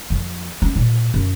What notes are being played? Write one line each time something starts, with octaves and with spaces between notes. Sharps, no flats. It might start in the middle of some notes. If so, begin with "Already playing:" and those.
F2
C#4
A#2
F#2